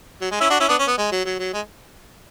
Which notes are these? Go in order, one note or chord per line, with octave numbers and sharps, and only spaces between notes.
F#3
G#3
C#4 E4
D4 F#4
C#4 E4
B3 D4
C#4
B3
G#3
F#3
F#3
F#3
G#3